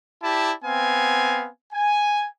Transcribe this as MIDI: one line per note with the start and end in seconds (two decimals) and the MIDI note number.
0.22 0.52 64
0.22 0.52 67
0.22 0.52 74
0.22 0.52 81
0.64 1.47 59
0.64 1.47 60
0.64 1.47 77
0.64 1.47 80
1.73 2.27 80